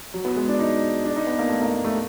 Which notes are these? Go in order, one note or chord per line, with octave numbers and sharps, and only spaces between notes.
F#3
B3
G#3
D4
D#4
D4
D#4
B3
A#3
A3
A#3
A3